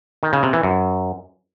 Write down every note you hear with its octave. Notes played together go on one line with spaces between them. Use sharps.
D#3
C#3
C3
E3
F#2